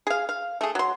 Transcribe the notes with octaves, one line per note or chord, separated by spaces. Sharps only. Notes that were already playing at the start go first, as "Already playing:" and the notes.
G#4 F5
F5
A3 G#4
F#3 C6